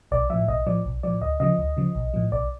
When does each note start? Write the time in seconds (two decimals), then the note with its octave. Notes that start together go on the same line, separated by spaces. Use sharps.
0.11 B1 D5
0.30 A2 F3 E5
0.48 B1 D#5
0.66 A2 F3 D5
0.85 B1
1.03 A2 F3 D5
1.21 D2 D#5
1.40 C#3 F3 D#5
1.58 D2
1.77 C#3 F3
1.95 B1
2.14 A2 F3
2.32 B1 D5